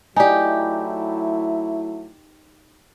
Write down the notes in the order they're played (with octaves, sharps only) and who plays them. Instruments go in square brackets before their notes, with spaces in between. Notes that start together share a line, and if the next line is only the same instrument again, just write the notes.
[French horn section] F#3 A3 E4 [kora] D#4 G4 [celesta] D5 G#5